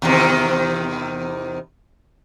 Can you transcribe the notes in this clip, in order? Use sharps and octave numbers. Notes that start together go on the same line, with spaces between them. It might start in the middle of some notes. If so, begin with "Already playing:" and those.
E2 C3 D#3